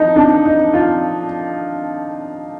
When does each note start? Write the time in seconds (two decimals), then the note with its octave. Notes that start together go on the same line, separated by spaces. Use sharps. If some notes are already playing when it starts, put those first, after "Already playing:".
Already playing: F3 D#4
0.16 D4
0.45 D#4
0.74 F4